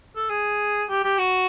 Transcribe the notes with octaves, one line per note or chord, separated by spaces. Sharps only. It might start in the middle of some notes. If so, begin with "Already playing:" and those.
A4
G#4
G4
G4
F#4